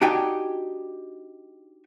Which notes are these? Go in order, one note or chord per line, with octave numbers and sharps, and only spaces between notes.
D4 D#4 F#4 G4 G5 G#5